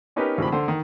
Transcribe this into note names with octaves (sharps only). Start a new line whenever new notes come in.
B3 C#4 D#4 G4 A#4 B4
D2 C3 F3 G#3 G4 B5
D3 A4 C5
D#3